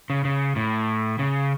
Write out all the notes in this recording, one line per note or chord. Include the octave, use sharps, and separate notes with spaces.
C#3
C#3
A2
C#3